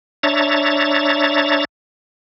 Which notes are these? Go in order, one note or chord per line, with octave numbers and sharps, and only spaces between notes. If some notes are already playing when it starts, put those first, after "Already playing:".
D4 C#5 E5 A#5 A6